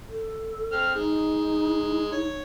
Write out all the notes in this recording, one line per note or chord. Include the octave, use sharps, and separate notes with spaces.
A4
C4 F6
G#3 D#4
C#5